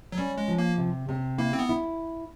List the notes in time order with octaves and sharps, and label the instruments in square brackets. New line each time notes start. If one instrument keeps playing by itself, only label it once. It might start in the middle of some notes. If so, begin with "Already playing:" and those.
[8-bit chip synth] F#3
[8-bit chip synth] G3 [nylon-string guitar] C#4
[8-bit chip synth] G#3
[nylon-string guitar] F3
[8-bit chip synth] A#3
[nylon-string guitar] C3
C3
[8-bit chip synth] A#3 [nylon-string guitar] E4
[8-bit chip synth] C4
B3
[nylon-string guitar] E4